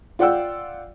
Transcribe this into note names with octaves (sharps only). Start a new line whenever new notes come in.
F4 D5 F#5 G5 E6